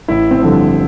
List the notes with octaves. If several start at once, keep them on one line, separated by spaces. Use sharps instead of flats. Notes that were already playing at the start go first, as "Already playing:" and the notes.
A1 E4
C4
G2 D3 F3